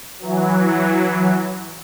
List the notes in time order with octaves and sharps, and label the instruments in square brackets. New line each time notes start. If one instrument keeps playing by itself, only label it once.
[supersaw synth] E3 F#3